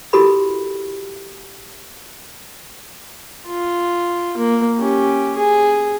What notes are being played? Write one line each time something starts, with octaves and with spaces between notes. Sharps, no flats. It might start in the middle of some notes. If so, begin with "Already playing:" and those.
E4 F#4 G4 A4 A#4 B5
F4
A#3
C#4 G4
G#4